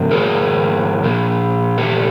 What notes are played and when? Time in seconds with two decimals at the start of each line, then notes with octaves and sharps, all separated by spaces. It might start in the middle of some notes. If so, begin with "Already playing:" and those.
Already playing: G#2 F3
0.11 G#4 A#4
1.04 A#2 F3
1.78 G4 A4